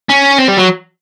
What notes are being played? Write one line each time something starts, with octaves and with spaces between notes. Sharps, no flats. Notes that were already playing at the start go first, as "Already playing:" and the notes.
C#4
C4
G3
F#3